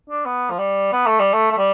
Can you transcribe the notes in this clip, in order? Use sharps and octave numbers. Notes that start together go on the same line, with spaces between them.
D4
B3
F3
G3
B3
A3
G3
A3
A3
G3